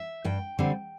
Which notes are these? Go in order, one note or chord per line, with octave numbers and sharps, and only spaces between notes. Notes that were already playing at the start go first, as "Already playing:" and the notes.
Already playing: E5
G2 G5
D3 G3 C4